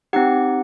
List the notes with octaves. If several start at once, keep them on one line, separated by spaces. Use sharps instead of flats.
C4 D#4 G4 F#5